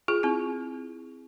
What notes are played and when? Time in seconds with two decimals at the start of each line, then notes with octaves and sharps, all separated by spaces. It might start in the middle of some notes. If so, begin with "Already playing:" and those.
0.08 F4 G#4
0.23 C4 E4